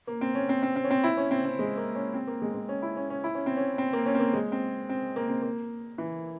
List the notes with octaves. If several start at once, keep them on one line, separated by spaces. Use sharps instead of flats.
A#3
C4
C#4
C4
C4
C4
C#4
C4
E4
C#4
C4
C4
G#3
A#3
C#4
C4
A#3
G#3
G#3
C#4
E4
C#4
C#4
E4
C#4
C4
C#4
C4
A#3
C#4
C4
A#3
G#3
C4
C4
A#3
C4
A#3
E3